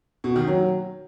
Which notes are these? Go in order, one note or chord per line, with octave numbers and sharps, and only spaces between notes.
B2
D#3
F#3